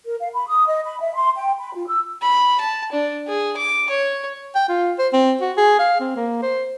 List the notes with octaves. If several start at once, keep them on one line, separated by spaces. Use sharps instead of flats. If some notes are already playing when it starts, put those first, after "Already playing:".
A#4
F5
B5
D#6
D#5
B5
E5
C6
G5
B5
F4
E6
B5
A5
D4
G#4
D6
C#5
G5
F4
C5
C4
F#4
G#4
F5
C4
A#3
C5